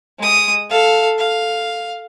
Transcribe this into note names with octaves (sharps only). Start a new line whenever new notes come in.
G#3 D#6
A4 F5
F5